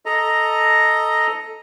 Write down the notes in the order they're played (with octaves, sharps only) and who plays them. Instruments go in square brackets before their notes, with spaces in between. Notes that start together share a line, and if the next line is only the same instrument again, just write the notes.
[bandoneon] A4 D#5 A#5